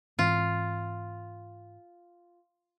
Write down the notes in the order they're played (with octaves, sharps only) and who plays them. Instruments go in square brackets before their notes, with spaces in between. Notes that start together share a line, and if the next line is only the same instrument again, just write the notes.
[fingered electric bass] G#2 E3 C4 [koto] F4